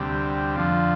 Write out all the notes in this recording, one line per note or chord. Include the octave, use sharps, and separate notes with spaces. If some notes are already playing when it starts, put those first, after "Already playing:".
Already playing: D2 C3 G3
F2 D3 F3